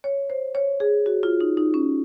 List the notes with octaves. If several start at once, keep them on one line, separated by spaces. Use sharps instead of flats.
C#5
C5
C#5
G#4
F#4
F4
D#4
D#4
C#4